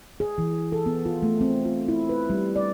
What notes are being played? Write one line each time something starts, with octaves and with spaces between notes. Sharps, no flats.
G#4
E3
A4
B3
F4
A3
C4
F4
E4
B4
G3
D5